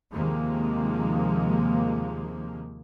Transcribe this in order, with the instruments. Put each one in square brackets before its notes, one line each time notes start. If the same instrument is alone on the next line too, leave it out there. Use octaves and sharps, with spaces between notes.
[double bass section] D#2 C3 D#3 F3 G#3 A#3